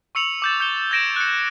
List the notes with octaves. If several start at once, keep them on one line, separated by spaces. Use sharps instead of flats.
C#6 E6 C#7 F7 F#7
D6 G6 A6
G6 C#7 G7
G6 G#6 A#6 D7 E7 G7
F#6 C#7